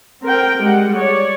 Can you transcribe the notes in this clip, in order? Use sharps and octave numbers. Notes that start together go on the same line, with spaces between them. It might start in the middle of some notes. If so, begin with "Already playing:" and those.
C4 A#4 G5
G3 G#3 F#5
C#5 D5